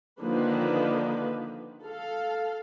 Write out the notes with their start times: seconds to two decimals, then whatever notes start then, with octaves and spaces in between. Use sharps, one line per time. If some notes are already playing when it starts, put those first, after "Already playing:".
0.22 D3 D#3 F3 A#3 D4 B4
1.84 A4 F5